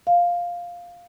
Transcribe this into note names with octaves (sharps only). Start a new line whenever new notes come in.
F5